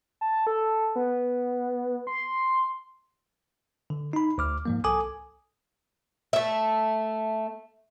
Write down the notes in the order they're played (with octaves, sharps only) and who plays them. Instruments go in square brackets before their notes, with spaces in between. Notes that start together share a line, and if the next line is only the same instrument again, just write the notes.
[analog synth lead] A5
A4
B3
C6
[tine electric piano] D3
D#4 B5
D2 D6 F6
G#2 F3 A#3
C2 A4 G#5 D6 D#6
[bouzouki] A3 E5